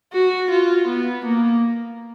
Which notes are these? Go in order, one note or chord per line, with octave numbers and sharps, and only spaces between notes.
F#4
F4
B3
A#3